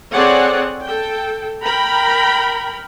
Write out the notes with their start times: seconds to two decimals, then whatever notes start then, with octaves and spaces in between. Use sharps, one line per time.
0.11 C4 G#4 A4 C#5 D5 F#5
0.83 A4 G5
1.62 A#4 G5 A#5 B5